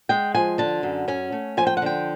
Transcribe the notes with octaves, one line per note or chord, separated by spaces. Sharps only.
G#3 G5
F3 G#5
D3 A5
F#2
C#4 G#5
A3
F3 G#5
G5
F#5
D3 G5